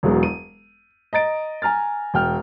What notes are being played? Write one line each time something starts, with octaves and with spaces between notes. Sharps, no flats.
E1 E2 F#3 G#3 B3
D#7
D#5 A#5 A6 D7
G#5 A#5 F6 A6
E1 G5 F6